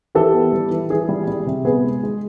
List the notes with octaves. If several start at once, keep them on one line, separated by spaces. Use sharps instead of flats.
E3 G4 A4
B3
G3
E3
E3 G#4
G3
G3
C3
B3 G#4
G#3
G#3